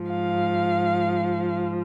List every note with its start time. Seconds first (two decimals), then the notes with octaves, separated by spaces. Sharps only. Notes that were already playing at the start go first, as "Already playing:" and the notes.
Already playing: G#2 F3
0.11 F5